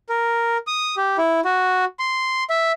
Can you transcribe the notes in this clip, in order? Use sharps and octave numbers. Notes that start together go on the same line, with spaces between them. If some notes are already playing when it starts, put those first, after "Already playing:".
A#4
D#6
G4
E4
F#4
C6
E5